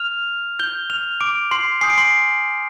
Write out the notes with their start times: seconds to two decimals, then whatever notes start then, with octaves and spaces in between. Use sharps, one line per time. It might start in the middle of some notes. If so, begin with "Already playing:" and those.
Already playing: F6 F7
0.59 G6 G7
0.90 F6 F7
1.21 D6 D7
1.51 C6 C7
1.81 G#5 D#6 G6 C7
1.90 D7
1.98 C6 C7